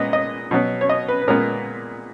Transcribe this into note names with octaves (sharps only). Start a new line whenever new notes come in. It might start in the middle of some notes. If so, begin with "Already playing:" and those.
Already playing: A#2 G#3 B3 D#5
D#5
B2 F#3 B3
C#5
D#5
B4
B4
A#2 G#3 B3 A#4